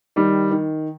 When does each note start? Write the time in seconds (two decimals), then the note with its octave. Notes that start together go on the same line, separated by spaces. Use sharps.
0.16 D#3 G3
0.51 D#3